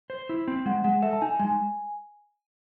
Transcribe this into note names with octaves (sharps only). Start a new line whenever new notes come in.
C5
E4
C4
G#3 F#5
G#3 F#5
A4 E5
A5
D#4 G#5
G#3 G#5